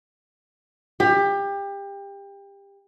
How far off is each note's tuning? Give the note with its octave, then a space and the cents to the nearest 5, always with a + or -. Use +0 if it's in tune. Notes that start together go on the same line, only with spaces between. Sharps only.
G4 +25